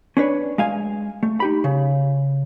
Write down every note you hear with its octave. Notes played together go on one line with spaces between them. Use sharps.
C#4 D4 B4 C#5
G#3 F5 G#5
A3
D#4 G4 B5
C#3